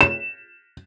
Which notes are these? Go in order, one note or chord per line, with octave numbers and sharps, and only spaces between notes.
E7